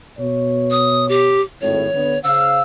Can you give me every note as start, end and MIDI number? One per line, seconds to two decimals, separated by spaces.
0.18 1.44 47
0.18 1.44 73
0.70 1.07 87
1.08 1.41 67
1.61 1.87 32
1.61 1.87 45
1.61 2.19 73
1.93 2.15 50
1.93 2.15 59
2.23 2.62 49
2.23 2.62 72
2.23 2.62 77
2.23 2.62 88